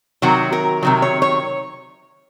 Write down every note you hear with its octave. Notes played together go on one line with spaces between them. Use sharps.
C3 D#3 F#3 F#4
A#4
C3 D#3 F#3
C#5
C#5